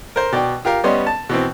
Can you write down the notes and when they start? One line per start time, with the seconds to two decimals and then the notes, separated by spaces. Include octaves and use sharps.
0.16 A#4 C5
0.32 B2 D5 G5
0.65 F4 G4 A#4 F5
0.84 G3 B3 C#4 D#5 C6
1.07 A5
1.29 B2 E3 C4